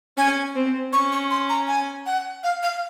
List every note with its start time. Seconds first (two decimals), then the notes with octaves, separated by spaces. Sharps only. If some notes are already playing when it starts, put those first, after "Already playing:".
0.17 C#4 G#5
0.56 C4
0.93 C#4 C#6
1.12 C#6
1.31 C6
1.49 A#5
1.68 G#5
2.06 F#5
2.43 F5
2.63 F5